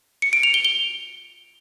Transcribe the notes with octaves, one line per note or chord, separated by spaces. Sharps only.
C#7
D7
F7
G7
G7